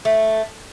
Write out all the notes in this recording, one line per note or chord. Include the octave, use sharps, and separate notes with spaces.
A3